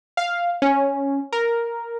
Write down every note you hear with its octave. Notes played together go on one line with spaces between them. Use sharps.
F5
C#4
A#4